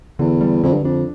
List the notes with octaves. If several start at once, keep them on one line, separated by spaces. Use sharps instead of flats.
E2 D3
G3
F2 D3
G2
F2 D4